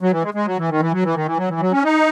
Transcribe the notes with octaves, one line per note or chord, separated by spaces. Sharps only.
F#3
E3
G#3
G#3
F#3
E3
D#3
E3
F#3
E3
D#3
E3
F#3
E3
F#3
C#4
D#4